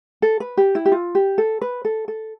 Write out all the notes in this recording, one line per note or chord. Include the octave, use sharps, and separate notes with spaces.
A4
B4
G4
E4
G4
F4
G4
A4
B4
A4
A4